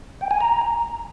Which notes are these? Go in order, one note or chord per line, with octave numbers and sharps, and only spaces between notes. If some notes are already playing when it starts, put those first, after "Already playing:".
G5
G#5
A#5